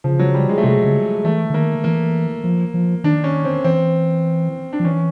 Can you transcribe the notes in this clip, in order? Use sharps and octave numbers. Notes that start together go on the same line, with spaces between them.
C#3 F3
F#3
G3
G#3
A3
C3 G#3
C#3
E3 A3
D3
D#3 A#3
E3 A#3
F3
F3
D#3 D4
C#4
C4
E3 C4
D4
F3
E3 C#4